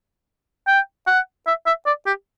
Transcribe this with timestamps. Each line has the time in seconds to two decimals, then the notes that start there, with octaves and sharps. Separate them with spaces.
0.68 G5
1.07 F#5
1.47 E5
1.66 E5
1.86 D5
2.06 G4